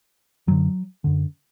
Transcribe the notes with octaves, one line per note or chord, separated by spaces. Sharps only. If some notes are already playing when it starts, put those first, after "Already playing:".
F#2 D3 F#3
F#2 D3